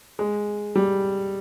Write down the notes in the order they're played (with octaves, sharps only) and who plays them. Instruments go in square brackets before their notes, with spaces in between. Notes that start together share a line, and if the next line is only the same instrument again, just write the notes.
[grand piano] G#3
G3